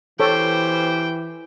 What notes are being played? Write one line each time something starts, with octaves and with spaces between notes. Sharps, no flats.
B2 E3 G4 A4 C5 C#5 G5